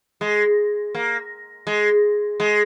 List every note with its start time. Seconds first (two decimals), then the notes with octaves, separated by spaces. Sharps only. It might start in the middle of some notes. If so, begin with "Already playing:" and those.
0.21 G#3
0.95 A#3
1.67 G#3
2.40 G#3